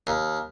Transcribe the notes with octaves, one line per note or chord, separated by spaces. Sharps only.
D#2